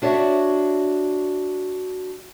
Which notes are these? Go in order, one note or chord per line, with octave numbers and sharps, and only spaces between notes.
D4 F#4 C#5 D5 E5